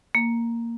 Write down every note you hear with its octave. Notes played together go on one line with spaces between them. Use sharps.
A#3